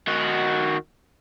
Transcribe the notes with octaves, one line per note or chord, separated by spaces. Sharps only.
D#3 F#4